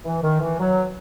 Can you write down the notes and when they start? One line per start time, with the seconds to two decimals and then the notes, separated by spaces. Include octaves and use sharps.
0.05 E3
0.23 D#3
0.41 E3
0.59 F#3